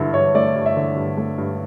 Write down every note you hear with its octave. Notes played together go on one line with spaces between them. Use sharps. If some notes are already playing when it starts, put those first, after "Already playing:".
Already playing: G2 D3 E4
G2 C#5
A3 D5
G2
E5
D3
G2
A3
G2